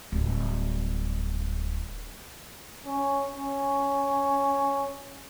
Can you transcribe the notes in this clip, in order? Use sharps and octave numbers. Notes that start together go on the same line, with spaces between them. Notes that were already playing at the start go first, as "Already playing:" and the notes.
D1 G3
C#4
C#4